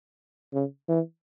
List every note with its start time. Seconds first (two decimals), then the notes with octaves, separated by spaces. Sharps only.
0.53 C#3
0.89 E3